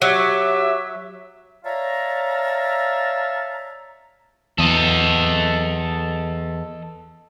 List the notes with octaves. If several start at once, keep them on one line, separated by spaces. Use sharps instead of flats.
F#3 F#4 G4 E5
C#5 D5 E5 F5 A5 A#5
E2 A4 D#5